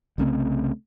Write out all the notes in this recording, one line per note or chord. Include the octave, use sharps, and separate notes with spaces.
C2 C#3 A3 C4